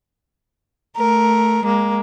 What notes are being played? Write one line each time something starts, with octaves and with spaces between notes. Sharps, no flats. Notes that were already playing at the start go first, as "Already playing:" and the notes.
A3 A#4
G#3 A#3